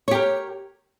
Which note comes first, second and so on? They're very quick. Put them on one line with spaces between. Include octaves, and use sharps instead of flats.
C#5 G4 A#4